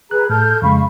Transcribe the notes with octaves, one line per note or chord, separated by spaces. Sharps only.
G#4 B4 A#5 F#6
A2 A4 F6 G6
F2 C#3 G#3 F5 B5 C#6